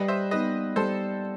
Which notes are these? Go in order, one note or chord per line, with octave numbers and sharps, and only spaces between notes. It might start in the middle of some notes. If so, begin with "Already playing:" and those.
Already playing: G3 B4 D#5
C5 E5
B3 D#4 G4 B4 D#5
G3 A4 C5